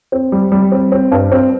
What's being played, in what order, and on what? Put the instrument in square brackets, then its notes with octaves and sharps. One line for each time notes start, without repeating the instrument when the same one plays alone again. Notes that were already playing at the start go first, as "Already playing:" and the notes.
[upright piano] C4
G3
G3
C4
C4
G2
C4